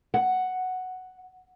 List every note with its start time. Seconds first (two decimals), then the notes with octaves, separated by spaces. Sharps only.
0.14 F#5